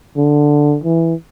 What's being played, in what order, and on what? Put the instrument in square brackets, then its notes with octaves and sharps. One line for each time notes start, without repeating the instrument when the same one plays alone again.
[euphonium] D3
E3